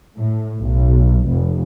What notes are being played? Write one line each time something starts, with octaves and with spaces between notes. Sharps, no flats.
A2
B1
F1